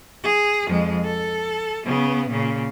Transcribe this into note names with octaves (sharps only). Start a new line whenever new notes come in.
G#4
F2 G#3
A4
C#3 B3
A#2 C#3